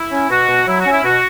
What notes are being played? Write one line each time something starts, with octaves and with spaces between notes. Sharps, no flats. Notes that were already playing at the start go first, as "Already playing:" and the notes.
Already playing: E4
C#4
B2 F#4
B2
F#3 E4
F#4
C#4 E4
B2 F#4